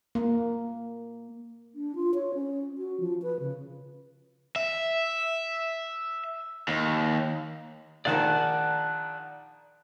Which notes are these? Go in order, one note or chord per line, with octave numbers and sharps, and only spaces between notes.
A#3
D4
F4
C#5
C#4
F#4
F3
B4
C#3
E5
D#2
A#1 D#3 A#4 D5 F#5 A5